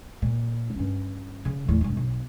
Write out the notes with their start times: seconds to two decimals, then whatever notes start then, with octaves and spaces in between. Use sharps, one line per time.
0.22 A#2
0.75 G2 C#4
1.45 C#3
1.68 E2 A2
1.81 E1 G2
1.97 B1